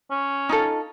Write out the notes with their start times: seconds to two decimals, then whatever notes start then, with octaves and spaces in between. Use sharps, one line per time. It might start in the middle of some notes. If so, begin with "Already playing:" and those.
0.11 C#4
0.49 D#4 F4 A4